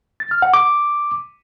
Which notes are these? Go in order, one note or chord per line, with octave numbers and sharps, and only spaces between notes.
A6
F6
F#5
D6